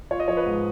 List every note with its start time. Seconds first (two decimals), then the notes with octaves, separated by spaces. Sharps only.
0.11 F4 C#5
0.20 D#5
0.28 F3 C#5
0.37 B4
0.46 G#2